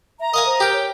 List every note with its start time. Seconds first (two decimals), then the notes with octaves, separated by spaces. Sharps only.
0.20 E5 A#5
0.34 A#4 D#5 F5 G#5 D#6
0.46 C5
0.60 G4 A#4 G5
0.73 C#5